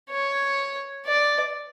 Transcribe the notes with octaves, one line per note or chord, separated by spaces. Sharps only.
C#5
D5